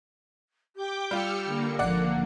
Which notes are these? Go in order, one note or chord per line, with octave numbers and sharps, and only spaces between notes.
G4 G5 D6 G6
G3 F4 E6 F6 C#7
D3 A#3
G#1 F3 D5 F#5